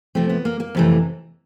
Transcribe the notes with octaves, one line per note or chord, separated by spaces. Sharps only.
C3 F3 A3 C4
B3
A#3
A#3
F2 C3 E3 A3